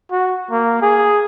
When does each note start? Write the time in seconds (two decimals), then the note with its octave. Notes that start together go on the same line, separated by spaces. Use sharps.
0.12 F#4
0.51 A#3
0.81 G#4